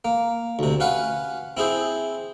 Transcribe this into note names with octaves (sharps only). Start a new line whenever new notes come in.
A#3
D2 C3
C#4 B4 F5 F#5
C4 E4 G#4 C5